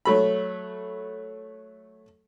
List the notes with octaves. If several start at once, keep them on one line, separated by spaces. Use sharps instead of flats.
F#3 A3 B5